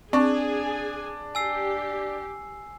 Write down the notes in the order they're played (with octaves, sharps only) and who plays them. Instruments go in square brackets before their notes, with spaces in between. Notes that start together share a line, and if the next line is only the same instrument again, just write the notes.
[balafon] C4 C#6 [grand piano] D4 [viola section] G#4 G#5
[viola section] G4 [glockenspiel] G#5 E6 C7